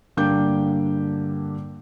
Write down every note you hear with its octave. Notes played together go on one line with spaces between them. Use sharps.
G2 D3 A#3 G5 D6 G6